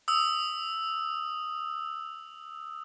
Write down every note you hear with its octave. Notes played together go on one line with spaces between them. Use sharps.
D#6 E6